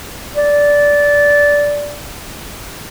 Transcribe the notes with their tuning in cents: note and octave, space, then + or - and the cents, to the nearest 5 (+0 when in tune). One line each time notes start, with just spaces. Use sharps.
D5 -15